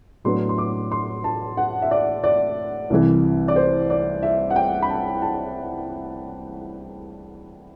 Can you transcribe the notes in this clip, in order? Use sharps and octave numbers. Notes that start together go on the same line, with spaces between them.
A2 F#3 B3 D4 C6
C6
D6
C6
A5
F#5
E5
D5
D5
C2 C3 E3
D5
C5
D5
E5
F#5
G5
B5
A5
A5